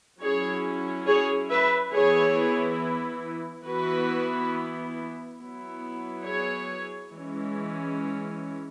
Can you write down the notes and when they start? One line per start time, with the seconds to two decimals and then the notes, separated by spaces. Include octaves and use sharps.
0.21 F#3 C#4 E4 G#4 C#5
1.07 G#4 C#5
1.50 B4 E5
1.93 E3 B3 E4 G#4 C#5
3.66 E3 B3 E4 F#4 B4
5.40 F#3 B3 E4
6.25 G#4 C#5
7.13 E3 G#3 C#4